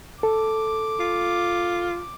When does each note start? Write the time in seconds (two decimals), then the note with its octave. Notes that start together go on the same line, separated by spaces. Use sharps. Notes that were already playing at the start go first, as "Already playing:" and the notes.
0.23 A4 D6
1.00 F4